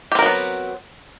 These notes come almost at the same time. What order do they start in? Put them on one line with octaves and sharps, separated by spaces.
G4 C4 A#4 F#3 B3